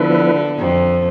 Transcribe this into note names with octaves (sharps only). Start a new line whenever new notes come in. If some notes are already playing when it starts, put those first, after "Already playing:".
Already playing: D3 F3 B3 E4 B4
F2